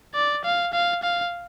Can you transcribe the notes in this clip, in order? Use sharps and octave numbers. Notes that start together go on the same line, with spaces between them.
D5
F5
F5
F5